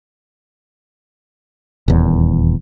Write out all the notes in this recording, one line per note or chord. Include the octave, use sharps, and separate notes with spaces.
D#1 E2